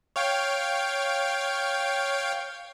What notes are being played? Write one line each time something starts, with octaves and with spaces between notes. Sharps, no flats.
C#5 F5 G5